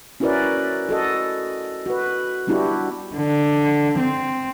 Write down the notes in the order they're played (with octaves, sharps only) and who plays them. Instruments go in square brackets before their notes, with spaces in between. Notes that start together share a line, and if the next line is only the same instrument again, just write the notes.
[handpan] C#4 E4 F#4 A#4 B4 D5
F#4 A4 D#5
F#4 B4
G3 B3 D4 E4 F#4 G4
[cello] D3
C4